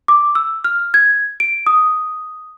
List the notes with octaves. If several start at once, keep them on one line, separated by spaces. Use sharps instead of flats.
D6
E6
F6
G#6
D7
D#6